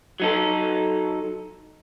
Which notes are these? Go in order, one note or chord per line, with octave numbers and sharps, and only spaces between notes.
F#3 D#4 A4